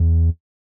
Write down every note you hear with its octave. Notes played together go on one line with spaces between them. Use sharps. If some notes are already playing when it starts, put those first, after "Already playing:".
Already playing: E2